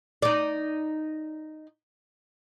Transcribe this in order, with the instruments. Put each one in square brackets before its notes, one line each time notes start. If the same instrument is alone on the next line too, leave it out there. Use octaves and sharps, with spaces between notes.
[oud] D#4 D5